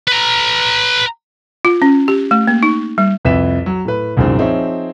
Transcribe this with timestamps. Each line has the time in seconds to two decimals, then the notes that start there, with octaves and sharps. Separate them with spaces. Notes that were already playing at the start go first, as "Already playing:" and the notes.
0.08 B4 A#5
1.65 F4
1.82 C#4
2.08 G4
2.31 A3
2.48 A#3
2.63 D#4
2.98 G3
3.25 C2 F2 B4 E5 B6 E7
3.66 F#3
3.85 A2 B4
4.17 C2 F#2 A#2 D#3 G#3 C4
4.38 F3 C4 D#4 G#4 C#5 E5